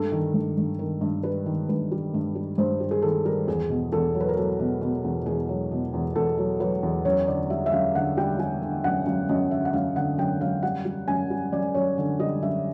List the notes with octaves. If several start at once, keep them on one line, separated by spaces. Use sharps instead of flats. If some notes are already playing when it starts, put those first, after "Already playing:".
Already playing: G2 A4
D#3
G2
G2
D#3 A#4
G2
G3 B4
D#3
G2 B4
G3
G2
G3
G2 C5
G3
G#4
D#3 A4
G3 A#4
E2 G#4
B2
E2 A4
F#3
B4
A#4
F#3 A4
B2
B2
E2
E2 G#4
F#3
B2
E2
E2 A4
F#3
F#3 B4
E2
F#2 C#5
D3 D5
G3 E5
E5
F#2 F5
D3 F#5
G3 G5
G3 G#5
D3
F#2 F#5
F#2 F5
F#2 D#5
D3 E5
F#5
F#2 F5
D3 F#5
F#2 G5
F#2 F5
G3 F#5
G3
F#2 G#5
G3
F#2 D5
F#2 C#5
D3
G3 D#5
F#2 E5